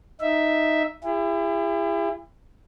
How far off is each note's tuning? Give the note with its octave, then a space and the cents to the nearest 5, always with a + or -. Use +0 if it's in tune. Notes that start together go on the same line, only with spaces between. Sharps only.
D#4 +0 E5 +0
E4 +30 G#4 -45